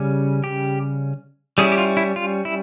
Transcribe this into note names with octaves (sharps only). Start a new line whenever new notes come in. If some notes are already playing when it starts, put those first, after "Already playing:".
Already playing: C#3 G3 C#4
G4
G3 C#4 E4 G#4
G4
F4
E4
F4
E4